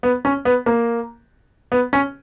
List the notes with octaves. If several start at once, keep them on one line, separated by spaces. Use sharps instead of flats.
B3
C#4
B3
A#3
B3
C#4